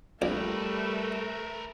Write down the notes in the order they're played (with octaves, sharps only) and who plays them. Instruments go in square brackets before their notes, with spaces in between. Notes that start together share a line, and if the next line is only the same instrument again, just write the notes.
[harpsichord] A#1 [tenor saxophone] G3 [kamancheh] A3 [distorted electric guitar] A#4 B4